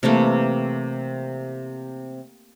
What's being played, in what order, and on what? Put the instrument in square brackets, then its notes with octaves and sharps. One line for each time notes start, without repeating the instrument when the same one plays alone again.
[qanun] C3 E3 A3 A#3